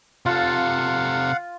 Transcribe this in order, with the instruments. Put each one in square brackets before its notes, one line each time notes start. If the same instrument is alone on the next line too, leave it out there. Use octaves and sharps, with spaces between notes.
[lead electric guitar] C3 A4 [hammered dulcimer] F4 [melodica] F5 F#5